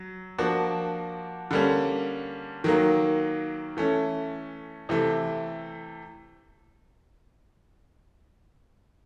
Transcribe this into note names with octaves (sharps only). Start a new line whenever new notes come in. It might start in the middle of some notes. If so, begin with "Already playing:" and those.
Already playing: F#3
F3 A#3 D4 F#4
D3 G3 A#3 C#4
D#3 F#3 A#3
E3 A3 C#4
C3 E3 A3